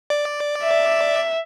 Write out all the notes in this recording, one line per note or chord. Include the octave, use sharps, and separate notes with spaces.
D5
E5